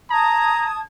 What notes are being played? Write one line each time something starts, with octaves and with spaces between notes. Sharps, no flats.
A5 A#5 D#6 G#6